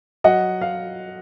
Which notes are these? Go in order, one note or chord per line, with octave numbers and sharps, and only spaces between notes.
F#3 D#5 F#5
F5